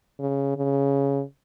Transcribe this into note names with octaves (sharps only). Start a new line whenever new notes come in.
C#3
C#3